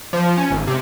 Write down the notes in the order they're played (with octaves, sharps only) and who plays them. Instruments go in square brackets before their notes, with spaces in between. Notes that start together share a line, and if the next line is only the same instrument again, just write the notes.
[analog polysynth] F3
C#4
G#1
C3